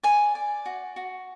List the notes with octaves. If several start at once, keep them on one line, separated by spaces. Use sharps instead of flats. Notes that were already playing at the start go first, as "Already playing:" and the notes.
D5 G#5
D5
F#4
F#4